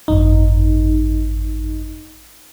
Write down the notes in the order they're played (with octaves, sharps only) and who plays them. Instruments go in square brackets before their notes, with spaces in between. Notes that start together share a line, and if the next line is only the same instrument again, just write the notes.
[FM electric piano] G#1 F#2 D#4